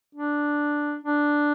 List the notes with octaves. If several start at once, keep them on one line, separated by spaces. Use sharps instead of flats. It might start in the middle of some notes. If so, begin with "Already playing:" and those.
D4
D4